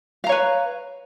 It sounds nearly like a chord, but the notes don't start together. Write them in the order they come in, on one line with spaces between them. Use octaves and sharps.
F5 A#5 C#5 B4